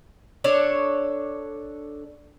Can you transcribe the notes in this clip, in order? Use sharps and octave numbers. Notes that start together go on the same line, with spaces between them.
D4 A4 C#5